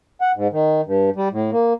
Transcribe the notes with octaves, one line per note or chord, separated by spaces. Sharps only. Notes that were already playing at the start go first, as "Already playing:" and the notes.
F#5
G#2
D#3
G2
G3
A2
A#3